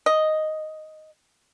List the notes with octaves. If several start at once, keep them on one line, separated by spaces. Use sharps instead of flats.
D#5